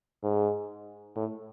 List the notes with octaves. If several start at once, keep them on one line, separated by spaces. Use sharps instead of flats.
G#2
A2